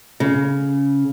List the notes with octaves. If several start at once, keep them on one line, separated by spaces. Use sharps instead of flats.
C#3